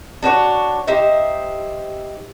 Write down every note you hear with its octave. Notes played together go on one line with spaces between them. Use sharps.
D4 F#4 A#4 C#5
D#4 G4 C5 E5